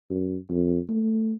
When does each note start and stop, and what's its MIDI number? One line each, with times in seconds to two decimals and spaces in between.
0.10 0.37 42
0.50 0.78 41
0.89 1.33 57